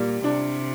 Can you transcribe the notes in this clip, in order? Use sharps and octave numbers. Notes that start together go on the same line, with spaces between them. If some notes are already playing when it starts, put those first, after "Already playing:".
Already playing: A#2 G3
C3 D4